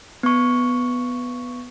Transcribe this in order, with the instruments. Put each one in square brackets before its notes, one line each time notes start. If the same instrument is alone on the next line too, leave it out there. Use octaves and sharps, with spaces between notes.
[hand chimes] B3 C#6